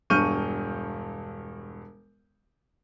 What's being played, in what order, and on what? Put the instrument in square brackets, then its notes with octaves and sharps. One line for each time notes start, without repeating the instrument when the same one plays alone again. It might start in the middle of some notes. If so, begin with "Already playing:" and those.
[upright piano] E1 G2 C#6 F6 G6 D#7